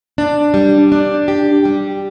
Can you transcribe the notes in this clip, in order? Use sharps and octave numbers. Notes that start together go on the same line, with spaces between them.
D4
G3
D4
G4
G3